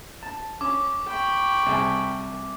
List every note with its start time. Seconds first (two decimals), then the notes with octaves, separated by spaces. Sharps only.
0.23 A5
0.61 C#4 D6
1.07 G5 B5 C#6
1.66 C2 G#4 A5